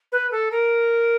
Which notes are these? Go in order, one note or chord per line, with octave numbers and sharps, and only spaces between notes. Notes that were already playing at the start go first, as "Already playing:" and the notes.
B4
A4
A#4